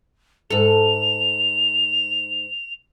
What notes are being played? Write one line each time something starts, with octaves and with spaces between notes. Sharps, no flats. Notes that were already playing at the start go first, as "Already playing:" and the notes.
G#2 A4 F7